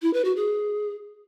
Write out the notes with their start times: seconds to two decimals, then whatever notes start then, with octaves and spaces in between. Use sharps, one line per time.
0.02 E4
0.13 B4
0.25 F#4
0.36 G#4